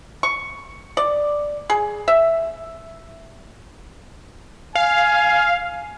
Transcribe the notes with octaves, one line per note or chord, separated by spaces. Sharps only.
C#6
D5
G#4
E5
F5 G#5